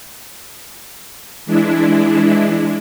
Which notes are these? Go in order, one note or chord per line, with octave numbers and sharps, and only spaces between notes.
E3 G#3 D4 E4